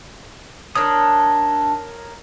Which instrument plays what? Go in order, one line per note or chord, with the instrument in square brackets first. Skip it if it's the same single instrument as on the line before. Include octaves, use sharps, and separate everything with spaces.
[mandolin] D4 A4 [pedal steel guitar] A#4 C#5 D#6